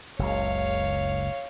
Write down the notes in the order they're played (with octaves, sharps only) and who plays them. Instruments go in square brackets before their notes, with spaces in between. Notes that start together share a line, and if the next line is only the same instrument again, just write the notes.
[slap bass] F#1 C#2 [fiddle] C#5 F5